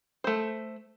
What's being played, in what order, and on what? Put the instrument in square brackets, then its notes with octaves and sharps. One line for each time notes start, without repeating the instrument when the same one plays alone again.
[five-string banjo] A3 C5